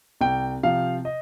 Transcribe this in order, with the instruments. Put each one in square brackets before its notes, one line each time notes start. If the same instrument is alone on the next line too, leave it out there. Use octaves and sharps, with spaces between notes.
[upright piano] C2 G5
C3 F3 F5
D#5